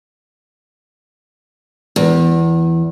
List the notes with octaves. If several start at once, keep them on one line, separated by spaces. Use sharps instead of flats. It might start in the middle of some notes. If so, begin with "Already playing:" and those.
E2